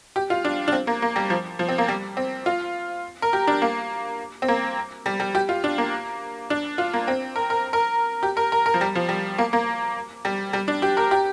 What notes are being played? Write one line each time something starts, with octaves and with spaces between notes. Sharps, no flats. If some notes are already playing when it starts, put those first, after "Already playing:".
G4
F4
D4
D4
C4
A#3
A#3
G3
F3
F3
C4
A#3
G3
C4
F4
A#4
G4
D4
A#3
C4
A#3
G3
G3
G4
F4
D4
A#3
D4
F4
A#3
C4
A#4
A#4
A#4
G4
A#4
A#4
A#4
F3
G3
F3
G3
A#3
A#3
G3
G3
D4
G4
A#4
G4